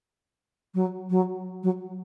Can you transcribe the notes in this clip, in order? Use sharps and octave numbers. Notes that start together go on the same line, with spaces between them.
F#3
F#3
F#3